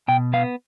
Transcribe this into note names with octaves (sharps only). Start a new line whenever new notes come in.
B2 G5
B3 F5